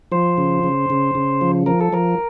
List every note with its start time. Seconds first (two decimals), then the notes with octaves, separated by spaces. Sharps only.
0.12 F3 C5
0.38 C#3
0.64 C#3
0.90 C#3
1.15 C#3
1.41 F3
1.66 F3 A#4
1.81 A4
1.93 F3 A#4